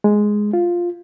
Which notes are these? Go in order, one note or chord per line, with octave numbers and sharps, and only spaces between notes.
G#3
F4